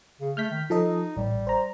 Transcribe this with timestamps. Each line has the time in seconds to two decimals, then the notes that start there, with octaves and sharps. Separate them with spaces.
0.20 C#3
0.37 A3 F6 G6 B6
0.51 D#3
0.70 F3 D#4 A4 D#5
1.17 A1 G3
1.47 C5 A#5